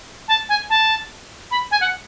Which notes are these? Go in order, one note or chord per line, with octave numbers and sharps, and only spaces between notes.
A5
G#5
A5
B5
G#5
F#5